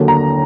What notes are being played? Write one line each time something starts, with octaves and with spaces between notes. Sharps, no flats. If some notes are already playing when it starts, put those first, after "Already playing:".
Already playing: D#2 D3 F#3
A#5